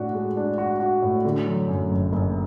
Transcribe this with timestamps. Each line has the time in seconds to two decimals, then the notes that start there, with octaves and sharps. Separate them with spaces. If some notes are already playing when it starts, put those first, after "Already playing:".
Already playing: A2 D4 F#4
0.14 G#3
0.37 D4
0.58 F#4
0.80 F#4
1.02 A2
1.25 D3
1.46 F#3
1.68 F#2
1.91 F#1
2.12 F#1